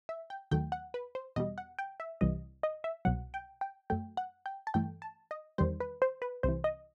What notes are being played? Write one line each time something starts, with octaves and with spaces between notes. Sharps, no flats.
E5
G5
D#2 D#3 F#3 A3 G5
F#5
B4
C5
E2 B2 G3 D#5
F#5
G5
E5
C2 C3 E3 G3 D#5
D#5
E5
C2 B2 F#3 F#5
G5
G5
F#2 F#3 A3 G5
F#5
G5
A5
G2 E3 A3 G5
A5
D#5
E2 D#3 G3 C5
B4
C5
B4
C2 C3 E3 C5
D#5